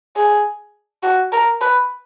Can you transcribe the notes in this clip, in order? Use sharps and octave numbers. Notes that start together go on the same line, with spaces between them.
G#4
F#4
A#4
B4